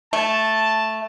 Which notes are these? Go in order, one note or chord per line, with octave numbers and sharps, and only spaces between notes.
A3 A5